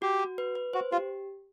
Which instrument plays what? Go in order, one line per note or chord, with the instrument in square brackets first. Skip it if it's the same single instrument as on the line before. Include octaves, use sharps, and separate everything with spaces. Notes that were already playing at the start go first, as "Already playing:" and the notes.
[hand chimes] F#4 [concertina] G4
[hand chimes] F#4
B4
B4
[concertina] F#4 [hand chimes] C5
[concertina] F4 [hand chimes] G4